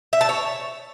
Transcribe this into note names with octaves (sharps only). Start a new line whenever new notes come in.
E5
A5
C#5